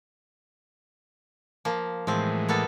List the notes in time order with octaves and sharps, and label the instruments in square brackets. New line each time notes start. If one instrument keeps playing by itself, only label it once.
[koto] F3 A#3
[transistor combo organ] A2 E3 G#3 [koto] F3 C4
[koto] A#3 B3 A4